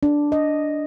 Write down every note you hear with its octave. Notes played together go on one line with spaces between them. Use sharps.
D4
D#5